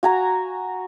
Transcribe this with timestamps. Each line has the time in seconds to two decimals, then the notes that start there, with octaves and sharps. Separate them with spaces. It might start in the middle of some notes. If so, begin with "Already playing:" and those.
0.03 F#4 G#5 A#5